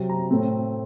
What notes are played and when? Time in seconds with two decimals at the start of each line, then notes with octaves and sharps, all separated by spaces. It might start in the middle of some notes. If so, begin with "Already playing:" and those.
Already playing: C3 F#3 C4
0.09 A#5
0.31 A2 A3 C4